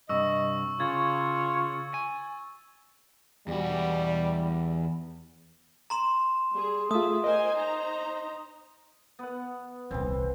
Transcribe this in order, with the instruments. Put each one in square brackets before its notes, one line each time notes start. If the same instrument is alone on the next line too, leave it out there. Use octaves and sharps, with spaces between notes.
[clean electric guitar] G2 C3 [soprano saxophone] D#5 [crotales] C#6 E6
[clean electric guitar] C#3 [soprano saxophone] F4 [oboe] C#5 [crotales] G#6 A6
[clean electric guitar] G#5
[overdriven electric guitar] E2 F#4 [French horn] G3
[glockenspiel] A#5 C6 E7
[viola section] G3 G#4
[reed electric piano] A3 F4 [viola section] G#4 E5 [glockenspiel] D#6
[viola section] A#4 C5 G#5 [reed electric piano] D#5
[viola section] D#4 C5 A#5
[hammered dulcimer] B3 F#5
[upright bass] D#1 C2 [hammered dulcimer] E3 C4